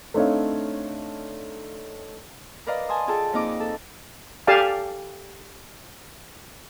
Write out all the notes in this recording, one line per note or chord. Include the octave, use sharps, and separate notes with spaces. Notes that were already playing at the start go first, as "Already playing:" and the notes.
A3 C4 D4 D#4 C#5 F5
A#4 B4 D5 D#5 F5 A#5
G#5 A5 C6 D#6
F4 G#4 A4 G5 A5
F2 A#3 D#4 D#5 D6
A4
G4 A4 D5 F5 G#5 A5